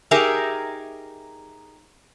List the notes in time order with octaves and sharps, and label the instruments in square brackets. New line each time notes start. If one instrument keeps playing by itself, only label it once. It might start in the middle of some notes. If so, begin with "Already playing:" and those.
[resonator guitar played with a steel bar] D#4 G4 G#4 A#4 E5